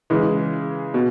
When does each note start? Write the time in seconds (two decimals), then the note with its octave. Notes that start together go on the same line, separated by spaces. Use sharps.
0.10 C#3 E3 G#3
0.94 B2